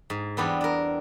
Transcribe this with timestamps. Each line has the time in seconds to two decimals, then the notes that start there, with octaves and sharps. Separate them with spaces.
0.10 G#2
0.37 E2 G3 B3 C4 D4
0.61 D4 A#4